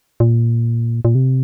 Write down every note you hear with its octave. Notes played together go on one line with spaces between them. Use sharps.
A#2
A#2
C3